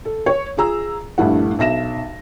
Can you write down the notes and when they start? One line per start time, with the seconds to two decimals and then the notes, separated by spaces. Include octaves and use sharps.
0.05 A4
0.26 C#5
0.57 F4 G#4 A#5 E6
1.18 A#1 G2 A3 E4 F#5
1.59 B1 E5 A#6 E7